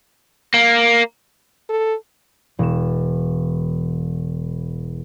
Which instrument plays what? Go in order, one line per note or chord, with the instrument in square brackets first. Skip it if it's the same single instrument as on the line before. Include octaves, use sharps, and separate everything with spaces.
[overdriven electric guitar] A#3
[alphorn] A4
[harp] E1 E7